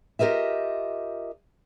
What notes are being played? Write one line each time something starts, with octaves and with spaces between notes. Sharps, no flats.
F4 G4 A#4 D#5 E5